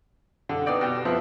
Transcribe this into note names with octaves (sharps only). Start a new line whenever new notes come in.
D3
B3 D#4 D5 G5
B2 G4
F3 B3 C4 E4